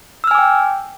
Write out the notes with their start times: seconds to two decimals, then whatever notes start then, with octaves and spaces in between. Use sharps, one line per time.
0.24 E6
0.27 F6
0.31 G#5
0.35 D6
0.38 G5